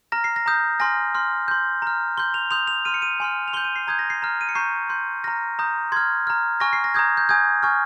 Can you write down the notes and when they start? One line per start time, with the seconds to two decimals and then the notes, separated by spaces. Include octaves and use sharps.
0.12 A#5 F6 A#6
0.24 C7
0.36 A#6
0.46 A#5 D#6 G6
0.80 G#5 C6 F6 A#6
1.15 C6 F6
1.48 C6 G6
1.82 A#5 F6
2.17 C6 G6 G7
2.34 F7
2.51 C6 D#6 G6 F7
2.68 F7
2.85 C6 F6 D#7
2.94 C#7
3.02 D#7
3.20 G#5 C6 F6
3.48 F7
3.53 C6 G6 G7
3.64 D#7
3.76 C7
3.87 A#5 D#6 G6 G#6
3.99 A#6
4.10 C7
4.22 A#5 F6
4.41 D#7
4.49 C#7
4.55 A#5 C#6 G6 C7
4.90 C6 G6
5.24 A#5 F6 A#6
5.59 A#5 D#6 G6
5.92 C6 F6 G#6
6.27 A#5 F6
6.60 G#5 C#6 F6 A#6
6.73 C7
6.84 A#6
6.94 A#5 D#6 G6 G#6
7.17 G6
7.29 G#5 D#6 G6 G#6
7.63 G#5 C#6 F6